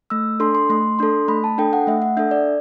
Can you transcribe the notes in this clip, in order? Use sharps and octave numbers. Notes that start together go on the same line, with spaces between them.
A3 E6
D4 A4 C6
C6
A3 C6
D4 A4 C6
A3 B5
A5
D4 A4 G5
F#5
A3 E5
F#5
D4 A4 E5
D5